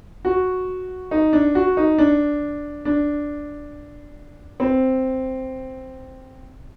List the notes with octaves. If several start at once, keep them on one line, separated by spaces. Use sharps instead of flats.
F#4
D#4
D4
F#4
D#4
D4
D4
C4